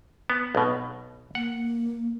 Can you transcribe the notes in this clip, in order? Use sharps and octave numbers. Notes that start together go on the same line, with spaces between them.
B3
B1 B2
A#3 F#5